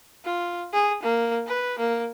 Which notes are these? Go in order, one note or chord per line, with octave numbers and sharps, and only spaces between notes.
F4
G#4
A#3
B4
A#3